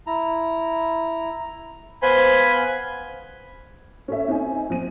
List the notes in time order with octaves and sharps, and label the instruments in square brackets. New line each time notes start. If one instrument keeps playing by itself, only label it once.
[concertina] E4 A#5
[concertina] B3 B4 F5 [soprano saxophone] C5 [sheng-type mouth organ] G#5 B5
[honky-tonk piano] C#4 A4 E5
C4 D#4 G#5
F3 C4 D#7